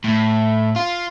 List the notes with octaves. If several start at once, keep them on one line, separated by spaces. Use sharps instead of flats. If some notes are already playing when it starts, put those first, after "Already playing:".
A2
F4